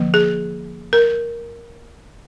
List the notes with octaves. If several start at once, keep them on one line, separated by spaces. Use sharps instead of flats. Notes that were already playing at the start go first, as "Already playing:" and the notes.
Already playing: D3 F3 A#3
G#4
A#4